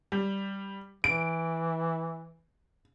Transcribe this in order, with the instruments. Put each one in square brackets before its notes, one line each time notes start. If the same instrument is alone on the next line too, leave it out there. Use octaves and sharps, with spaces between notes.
[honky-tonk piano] G3
[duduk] E3 [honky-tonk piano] D7